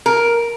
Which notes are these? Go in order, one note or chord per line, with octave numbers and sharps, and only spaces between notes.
A#4